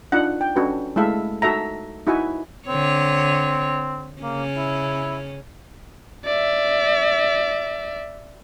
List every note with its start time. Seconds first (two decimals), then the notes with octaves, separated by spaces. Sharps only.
0.12 D4 D#4 F4 F#5
0.41 G5
0.56 C#4 D4 F#4 A4 B4
0.96 G#3 A3 E4 A4 E5 F5
1.42 D#4 F#4 A4 E5 A#5
2.07 D#4 E4 F#4 E5 F#5 G#5
2.68 D3 C4 C#5
4.22 C#3 A#3 C#4
4.56 E4
6.25 D5 E5